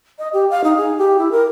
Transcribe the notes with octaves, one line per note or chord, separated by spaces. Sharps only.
D#5
G4
F5
D#4
G#4
G4
E4
A#4